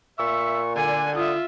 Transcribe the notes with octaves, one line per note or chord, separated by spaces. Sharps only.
A#2 E5 C#6
D3 D5 G#5
F4 E5 D#6